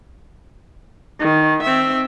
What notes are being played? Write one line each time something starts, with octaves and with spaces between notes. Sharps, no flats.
D#3
C4 E5